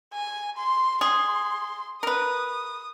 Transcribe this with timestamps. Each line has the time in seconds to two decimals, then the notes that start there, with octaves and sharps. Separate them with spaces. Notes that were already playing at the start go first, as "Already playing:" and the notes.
0.13 G#5
0.57 C6
1.01 G#4 C6
2.03 A#4 B4 D#6